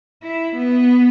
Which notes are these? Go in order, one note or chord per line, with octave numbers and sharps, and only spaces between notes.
E4
B3